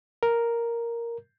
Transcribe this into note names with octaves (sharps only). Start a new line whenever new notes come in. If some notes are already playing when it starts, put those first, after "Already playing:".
A#4